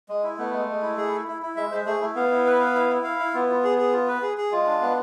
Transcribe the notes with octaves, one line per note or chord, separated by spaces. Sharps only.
G#3
E4
A3 B3
G#3
G#3
E4
G#4
E4
E4
E4
G#3 E5
G#3 C5
A3 G#4
A3 E4
B3 F5
E4
B4
F5
E4
E4
F5
E4
B3 F4
F4
G#4
G#4
F4
B4
G#4
G#4
G#3 F4
D4
B3